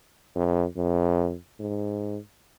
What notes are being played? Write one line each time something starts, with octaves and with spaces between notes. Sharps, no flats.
F2
F2
G#2